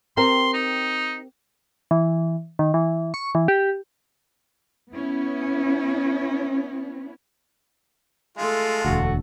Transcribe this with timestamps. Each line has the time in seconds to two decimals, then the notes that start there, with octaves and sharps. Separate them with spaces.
0.17 C4 G4 A#4 C6
0.53 D#4
1.91 E3
2.59 D#3
2.74 E3
3.14 C#6
3.35 E3
3.48 G4
4.92 B3 C#4 E4
8.38 G#3 A3 F4 A4
8.85 E1 D2 F#4